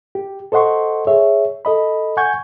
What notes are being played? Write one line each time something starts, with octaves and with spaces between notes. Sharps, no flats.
G4
A4 C5 D#5 F#5 C6 C#6
G#4 C#5 E5
A4 D#5 B5
F#5 G#5 C#6 G6 G#6